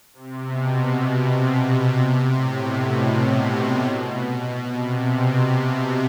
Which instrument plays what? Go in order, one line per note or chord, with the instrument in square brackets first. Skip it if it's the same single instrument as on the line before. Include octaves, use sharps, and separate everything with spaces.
[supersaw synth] C3
B2
C3
C3
A2
B2
C3